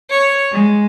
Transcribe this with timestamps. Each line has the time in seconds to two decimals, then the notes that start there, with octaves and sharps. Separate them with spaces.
0.10 C#5
0.52 G#3